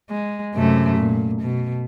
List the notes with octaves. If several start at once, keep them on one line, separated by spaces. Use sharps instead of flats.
G#3
F#2 C3 A3
A#2
B2